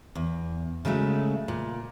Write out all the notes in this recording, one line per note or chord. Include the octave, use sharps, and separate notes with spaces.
E2
C#3 F#3 G#3 A3
A#2